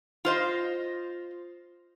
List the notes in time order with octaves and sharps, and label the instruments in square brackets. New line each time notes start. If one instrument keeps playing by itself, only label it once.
[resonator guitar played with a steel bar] F4 C5 D#5